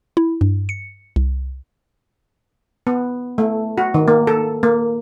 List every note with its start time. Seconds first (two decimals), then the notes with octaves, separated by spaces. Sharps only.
0.17 E4
0.41 G2
0.69 C#7
1.16 C2
2.87 B3
3.38 A3
3.78 F#4
3.94 D#3
4.08 A#3
4.27 A4
4.63 A#3